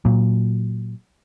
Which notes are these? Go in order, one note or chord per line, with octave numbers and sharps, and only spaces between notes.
A#2 F#3